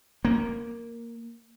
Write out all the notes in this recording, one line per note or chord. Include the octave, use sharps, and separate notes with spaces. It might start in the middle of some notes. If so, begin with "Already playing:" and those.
A#3